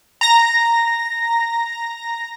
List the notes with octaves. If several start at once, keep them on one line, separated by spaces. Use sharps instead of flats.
A#5 A#6